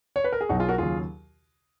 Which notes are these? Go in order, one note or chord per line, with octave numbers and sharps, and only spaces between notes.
C#5
B4
A#4
G#4
B1 B2 F#3 D#4 F#4
F4 G#4
F#4 A#4
D#2 C#3 F#3 F4 G#4